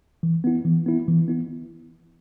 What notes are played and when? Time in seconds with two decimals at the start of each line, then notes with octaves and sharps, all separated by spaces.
0.23 E3
0.44 B3 E4
0.65 E3
0.86 B3 E4
1.08 E3
1.28 B3 E4